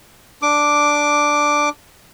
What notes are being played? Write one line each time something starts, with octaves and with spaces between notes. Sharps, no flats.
D4 D6